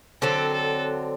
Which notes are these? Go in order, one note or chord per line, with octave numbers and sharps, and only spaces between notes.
D3 F#3 C4 A4
A4